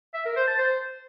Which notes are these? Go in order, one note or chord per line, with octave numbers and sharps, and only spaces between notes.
E5
A#4
C5
A5
C5